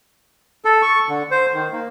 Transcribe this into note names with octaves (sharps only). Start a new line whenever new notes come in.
A4
C#6
D3
C5
D#3
A#3